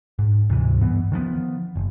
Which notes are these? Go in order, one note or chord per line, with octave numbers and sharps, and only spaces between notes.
G#2
D2 G#2 C3 E3
G1 G2 E3 B3
D#3 F3 G3 B3
F#1